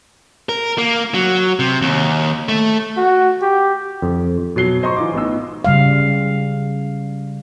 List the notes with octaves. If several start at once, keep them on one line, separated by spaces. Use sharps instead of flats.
A#4
A#3
F#3
C3
D#2
A3
F#4
G4
F2
B2 F#3 C7 G7
C5 D#5 A#5 C6 C#6
E3 F4 D6
A1 B3 D#4 E6
C#3 G3 F5